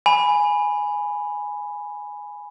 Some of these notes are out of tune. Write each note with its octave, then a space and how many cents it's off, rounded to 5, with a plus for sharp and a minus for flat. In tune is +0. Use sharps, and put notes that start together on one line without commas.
G#5 +0 B5 +0